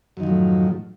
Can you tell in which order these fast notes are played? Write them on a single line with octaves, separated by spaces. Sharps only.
F#2 D#3 F3 F#3 A2